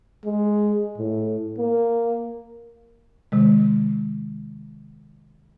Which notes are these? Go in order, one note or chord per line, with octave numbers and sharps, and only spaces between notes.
G#3
A2
A#3
C3 D#3 G#3